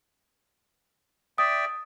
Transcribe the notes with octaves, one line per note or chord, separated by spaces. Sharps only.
D5 E5 G5 D#6